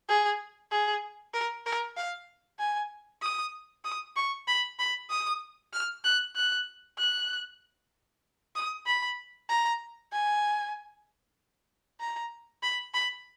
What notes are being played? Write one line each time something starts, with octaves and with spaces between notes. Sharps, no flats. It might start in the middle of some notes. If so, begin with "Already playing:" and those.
G#4
G#4
A#4
A#4
F5
G#5
D#6
D#6
C#6
B5
B5
D#6
F6
F#6
F#6
F#6
D#6
B5
A#5
G#5
A#5
B5
B5